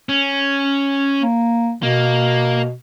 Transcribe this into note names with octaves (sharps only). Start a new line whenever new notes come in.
C#4
A#3
B2 A#3